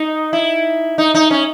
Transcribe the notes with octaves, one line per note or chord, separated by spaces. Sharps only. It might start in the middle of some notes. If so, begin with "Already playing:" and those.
Already playing: D#4
E4
D#4
D#4
C#4